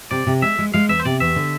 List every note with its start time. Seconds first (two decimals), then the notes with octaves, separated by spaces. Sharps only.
0.11 C3 D5
0.27 C3
0.42 G#3 E5
0.59 G#3
0.74 G#3 F5
0.89 E2 E5
1.00 C5
1.05 C3 D5
1.20 E2 E5
1.36 D3